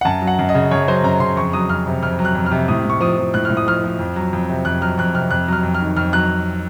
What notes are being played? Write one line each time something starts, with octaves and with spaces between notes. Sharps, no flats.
F#5
F#2 A5
F#3
F#5
F#2
D#5
C#3
F#2 C#5
F#3 C5
F#2 A#5
C#3 C6
F2 C#6
F#3 D#6
F2 F6
C3
F2 F6
F#3
F#6
F2
F6
C3
A2 D#6
A2 C#6
F3 D#6
F3
A2 F#6
A2 F6
D#6
F3 F6
F3
F2
F#3
F2
C3
F2 F#6
F#3 F6
F2 F#6
C3 F6
F2 F#6
F#3 F6
F2
F6
D#3
F2 F6
F#3 F#6